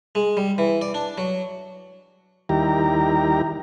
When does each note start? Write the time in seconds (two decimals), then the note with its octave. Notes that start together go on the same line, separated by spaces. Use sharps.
0.15 G#3
0.37 G3
0.58 E3
0.81 D5
0.94 D4
1.18 F#3
2.49 D#2 D#3 G3 E4 G4 A#5